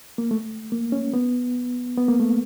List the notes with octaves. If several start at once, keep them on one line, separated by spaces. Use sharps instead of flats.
A#3
A3
A#3
C#4
B3
B3
A#3
A3